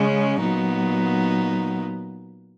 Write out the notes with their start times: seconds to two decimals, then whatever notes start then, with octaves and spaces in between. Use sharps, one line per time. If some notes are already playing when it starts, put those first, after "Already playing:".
Already playing: C#3 G#3 C#4
0.39 A#2 F#3 B3 D#4